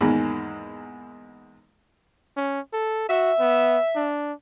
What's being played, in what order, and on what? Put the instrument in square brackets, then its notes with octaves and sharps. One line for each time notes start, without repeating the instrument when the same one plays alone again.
[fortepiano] E2 G#2 D#3 G#3 A#3
[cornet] C#4
A4
[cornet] F#4 [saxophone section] E5
[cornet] B3
D4